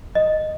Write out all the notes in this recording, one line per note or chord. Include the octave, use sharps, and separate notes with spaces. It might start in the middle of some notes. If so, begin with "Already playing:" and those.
D#5